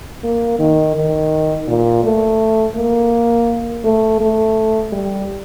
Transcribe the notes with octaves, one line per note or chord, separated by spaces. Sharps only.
A#3
D#3
D#3
A#2
A3
A#3
A3
A3
G3